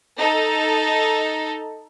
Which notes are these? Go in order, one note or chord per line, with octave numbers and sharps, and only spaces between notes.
D#4 A4